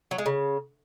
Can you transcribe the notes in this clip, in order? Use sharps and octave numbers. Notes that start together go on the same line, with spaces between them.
F#3
G#3
C#3